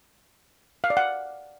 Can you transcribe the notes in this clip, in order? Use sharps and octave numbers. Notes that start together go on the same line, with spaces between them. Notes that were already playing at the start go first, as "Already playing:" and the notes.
F5
D5
F#5